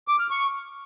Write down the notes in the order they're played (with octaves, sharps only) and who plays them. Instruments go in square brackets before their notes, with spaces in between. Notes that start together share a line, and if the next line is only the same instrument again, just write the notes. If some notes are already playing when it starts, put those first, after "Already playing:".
[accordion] D6
F6
C#6